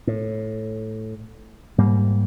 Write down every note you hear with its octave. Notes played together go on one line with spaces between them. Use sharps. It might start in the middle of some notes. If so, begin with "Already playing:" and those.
A2
G#2 G3 A#3